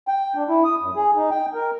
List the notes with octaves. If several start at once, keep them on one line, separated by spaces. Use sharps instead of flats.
G5
D4
E4
D#6
F#2
G#4
D#4
G5
A#4